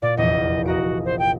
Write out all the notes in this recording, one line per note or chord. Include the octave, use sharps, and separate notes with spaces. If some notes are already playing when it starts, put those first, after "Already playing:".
A#2 D5
F1 A#1 E2 D#5
F#4 D#5 A#5 D7
C5
G5